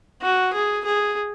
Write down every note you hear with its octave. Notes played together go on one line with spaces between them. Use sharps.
F#4
G#4
G#4